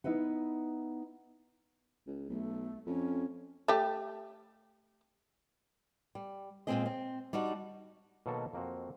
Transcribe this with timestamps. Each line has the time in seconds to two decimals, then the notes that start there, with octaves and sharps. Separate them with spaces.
0.04 B3 D#4 E4 B4 F#5
2.07 C#2
2.29 B1 A3
2.87 F2 C#4
3.68 A3 G4
6.15 G3
6.67 A#2 E3 G#3 C4 G#4 D#5
6.86 C4
7.33 G3 D4 D#4 F#4
8.26 B2 D#3 F#3 A#3 F#4 A4
8.53 F2 A#3 C4 F#4